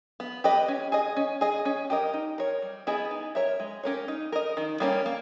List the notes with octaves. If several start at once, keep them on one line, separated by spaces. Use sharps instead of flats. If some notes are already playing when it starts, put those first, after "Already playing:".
B3
G4 B4 D#5
C#4
G#4 D#5
C#4
G#4 D#5
C#4
G4 A#4 D#5
D#4
A#4 C#5
G3
B3 E4 G#4 D#5
D#4
A#4 C#5 E5
G#3
C#4 G4 A#4 C#5
D#4
A#4 D#5
D#3
G3 A#3 C#4
A#3